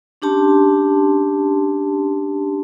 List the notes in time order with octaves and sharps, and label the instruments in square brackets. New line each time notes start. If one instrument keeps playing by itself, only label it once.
[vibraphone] C#4 D4 G4 A5 C6